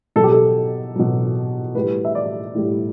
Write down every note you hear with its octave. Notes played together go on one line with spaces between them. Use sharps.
B2 F#3 A4
G4
A4
B2 F#3
A2 G3 B4
E5
D5
A2 G3